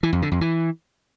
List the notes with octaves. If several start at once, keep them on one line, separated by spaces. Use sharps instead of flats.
E3
F2
D3
F2
E3